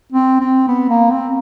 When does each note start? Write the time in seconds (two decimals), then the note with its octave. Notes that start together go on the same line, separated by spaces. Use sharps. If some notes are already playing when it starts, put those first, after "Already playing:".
0.12 C4
0.40 C4
0.68 B3
0.89 A#3
1.11 C4